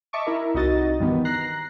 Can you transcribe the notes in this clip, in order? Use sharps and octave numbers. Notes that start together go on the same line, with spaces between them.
D#5 E5 A5 C#6 D6
E4 A#4 E5
C2 D#4 F#4 D#5 A6
G2 D#3 E3 B3
A#5 F#6 A#6 C7